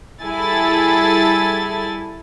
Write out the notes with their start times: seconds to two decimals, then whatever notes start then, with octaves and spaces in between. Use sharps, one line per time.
0.24 G3 E4 G#4 A4 G#5 A6